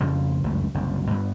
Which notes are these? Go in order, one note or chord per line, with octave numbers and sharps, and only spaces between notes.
F2 C#3 F3 G3
F1 C#2 F#2 A3
F#1 C2 F#2
G2 G3 G#3 B3